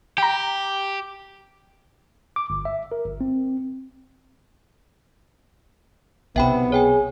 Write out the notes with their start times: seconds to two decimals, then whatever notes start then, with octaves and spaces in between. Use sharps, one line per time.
0.18 G4 G5 A#5
2.36 D6
2.50 G1
2.65 E5
2.92 A#4
3.04 G1
3.21 C4
6.36 B1 C3 B3 E5 G5 B5
6.72 G#4 C#5 G5 G#5